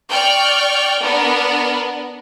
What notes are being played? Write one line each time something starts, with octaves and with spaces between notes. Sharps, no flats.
D5 G5 C#6 F6
B3 D4 A#4